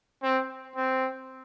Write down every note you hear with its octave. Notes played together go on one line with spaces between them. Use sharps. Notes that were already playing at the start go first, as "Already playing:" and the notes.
C4
C4